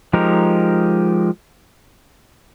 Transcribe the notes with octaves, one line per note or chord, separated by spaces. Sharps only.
F3 G#3 D#4 G4 A#4